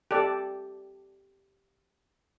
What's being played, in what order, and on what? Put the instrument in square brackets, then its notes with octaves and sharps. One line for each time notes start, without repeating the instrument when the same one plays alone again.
[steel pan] G4 A4 D5